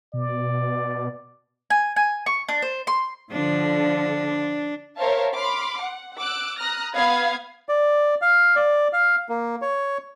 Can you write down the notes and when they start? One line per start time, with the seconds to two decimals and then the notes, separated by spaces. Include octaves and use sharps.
0.14 B2 D5
1.70 G#5
1.96 G#5
2.26 C#6
2.49 D4
2.62 C5
2.87 C6
3.32 D3 F3 D4
4.97 A#4 C5 C#5 E5 F5 A5
5.34 B5 C6 D6 F6
5.79 F#5
6.18 D6 E6 F#6
6.58 A#5 D#6 F6 F#6 A#6
6.93 B3 F5 B5 D#6 G#6
7.69 D5
8.22 F5
8.56 D5
8.93 F5
9.29 A#3
9.62 C#5